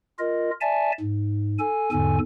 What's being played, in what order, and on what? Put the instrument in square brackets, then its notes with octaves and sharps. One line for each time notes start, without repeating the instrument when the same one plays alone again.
[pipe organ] F4 A#4 D#5
D5 E5 G#5 A5
G#2
A4 G#5
E2 G#2 D3 A4 G#5